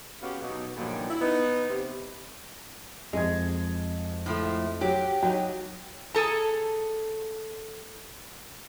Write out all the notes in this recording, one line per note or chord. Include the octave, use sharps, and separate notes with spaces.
C#3 B3 C#4 F#4 G4 F5
B2 F#3 D#4
G2 A#2 D3 D#3 F3 F#3
E4
B3 D#4
C3
F2 G#3 D#5 G#6
A2 F3 A3
F#3 G4
F#3 D#4 G5
G#4 A4 A#5